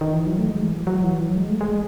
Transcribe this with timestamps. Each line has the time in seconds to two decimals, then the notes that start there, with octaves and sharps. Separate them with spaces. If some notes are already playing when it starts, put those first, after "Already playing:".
0.01 D#3
0.13 E3
0.26 F#3
0.39 A3
0.50 G#3
0.62 E3
0.75 F#3
0.87 F#3
1.04 E3
1.20 F#3
1.36 G#3
1.49 A3
1.61 G#3